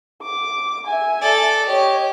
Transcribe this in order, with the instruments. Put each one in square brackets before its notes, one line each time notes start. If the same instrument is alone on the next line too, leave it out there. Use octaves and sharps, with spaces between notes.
[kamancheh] D6
E5 G#5
[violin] A4 D5
[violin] G4 [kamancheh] C#5 D#5